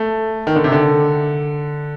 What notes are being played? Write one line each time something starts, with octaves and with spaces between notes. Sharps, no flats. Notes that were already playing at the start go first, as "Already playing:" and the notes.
Already playing: A3
D#3
D3
C3
D3